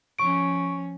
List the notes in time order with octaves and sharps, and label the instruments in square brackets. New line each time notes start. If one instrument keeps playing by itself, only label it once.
[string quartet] F3 C#4 [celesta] C#6 D7